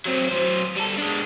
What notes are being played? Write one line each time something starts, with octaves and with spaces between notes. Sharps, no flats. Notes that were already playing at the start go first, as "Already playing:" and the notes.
F#3 C4
F#3 C5
G3 A4
G#3 D4